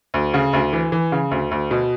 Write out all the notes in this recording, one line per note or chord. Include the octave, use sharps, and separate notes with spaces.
D2
C#3
D2
E3
E3
C#3
D2
D2
B2